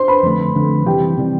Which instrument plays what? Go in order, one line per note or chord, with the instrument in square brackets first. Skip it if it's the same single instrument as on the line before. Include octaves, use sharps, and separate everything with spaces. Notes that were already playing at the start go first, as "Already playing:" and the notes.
Already playing: [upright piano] C5 C6
B4 B5
[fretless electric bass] F2 D3 A3
F2 D3 A3
[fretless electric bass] C3 E3 G3 [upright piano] G4 G5
[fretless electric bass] C3 E3 G3